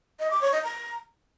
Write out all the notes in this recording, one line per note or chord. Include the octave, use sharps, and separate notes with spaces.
D#5
D6
C#5
D#5
A#5